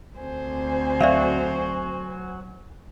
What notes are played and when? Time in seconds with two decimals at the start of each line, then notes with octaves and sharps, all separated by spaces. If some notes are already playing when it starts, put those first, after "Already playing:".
0.18 D2 C4 C5 G#5
1.01 F#3 F#4 D5 E5 F5